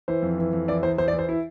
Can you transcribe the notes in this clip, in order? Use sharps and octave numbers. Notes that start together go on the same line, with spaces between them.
E3 C5
F2
E3
F2
E3 D5
E2 C5
E2 C5
D5
E3
C5
E4